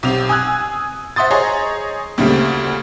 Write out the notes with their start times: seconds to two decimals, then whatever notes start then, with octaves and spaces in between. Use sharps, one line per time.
0.03 B1 C3 C4 F7
0.29 G#5 D#6 E6 F#6 G#6
1.16 C5 E5 F#5 C6 D#6 A6
1.31 G#4 C5 C#5 D#5 A#5
2.18 D2 A#2 C#3 G3 A3 C4